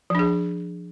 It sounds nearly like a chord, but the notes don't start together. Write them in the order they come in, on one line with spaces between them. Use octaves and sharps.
F3 D4 G#4